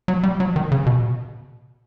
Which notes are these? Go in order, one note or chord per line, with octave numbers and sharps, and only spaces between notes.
F#3
G3
F#3
D#3
C#3
B2